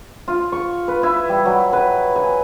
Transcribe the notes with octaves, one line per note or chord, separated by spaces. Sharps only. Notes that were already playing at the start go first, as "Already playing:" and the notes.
F4
C#6
B4
E4
G3
F#3
B4
G#5